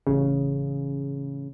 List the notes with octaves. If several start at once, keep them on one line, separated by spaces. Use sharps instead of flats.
A1 C#3